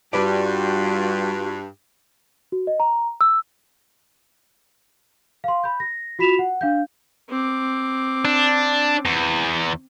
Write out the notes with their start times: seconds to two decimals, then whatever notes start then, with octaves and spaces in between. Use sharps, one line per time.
0.13 G2 G3 D4 F4 F#4 B4 D5
2.52 F#4
2.67 D#5
2.80 A#5
3.21 E6
5.44 F5 C6
5.64 B5 G6
5.80 A#6
6.19 F4 F#4 B5 B6 E7 F7
6.39 F#5
6.61 D4 F5 G6
7.29 C4 D6
8.25 D4
9.05 E2